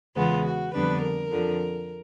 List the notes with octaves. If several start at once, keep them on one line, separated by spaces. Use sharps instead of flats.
E2 C#3 E3 G#3 B3 F4
F#4
F2 D3 G3 B3 D4 B4
A#4
F2 D3 F3